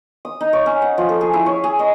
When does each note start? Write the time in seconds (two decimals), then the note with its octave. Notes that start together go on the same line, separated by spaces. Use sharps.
0.25 D#6
0.41 D#4
0.53 C#5
0.66 C#4
0.82 F#5
0.98 F3
1.09 A4
1.21 G#4
1.33 E4
1.46 C#5
1.64 G#4
1.79 D#5